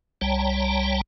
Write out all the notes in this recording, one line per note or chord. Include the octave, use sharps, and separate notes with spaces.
C2 G3 C#5 G5 A5 A#5